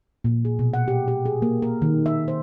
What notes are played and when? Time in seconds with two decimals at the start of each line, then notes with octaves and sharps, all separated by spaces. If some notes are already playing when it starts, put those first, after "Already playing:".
0.24 A#2
0.45 G#4
0.59 B2
0.74 F#5
0.88 G4
1.08 G4
1.25 G#4
1.42 A#3
1.62 A#4
1.82 D#3
2.06 E5
2.28 C5